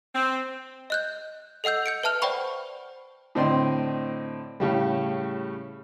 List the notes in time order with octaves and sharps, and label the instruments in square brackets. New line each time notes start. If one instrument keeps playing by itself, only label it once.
[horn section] C4
[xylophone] D#5 F#6 G6
A4 D#5 F#5 E6 G6
G6 C#7 D7
B4 E5 A5 F6 F7
C5 D5 F#5 G5 B5 C#6
[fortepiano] A2 D3 C4 D5 D#5 C6
A2 C#3 G3